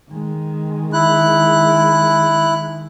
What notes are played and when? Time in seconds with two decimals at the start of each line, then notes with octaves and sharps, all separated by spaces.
0.11 D#3 G#3
0.93 E4 F#6